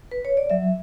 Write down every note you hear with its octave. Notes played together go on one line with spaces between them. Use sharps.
B4
C#5
D5
F#3 E5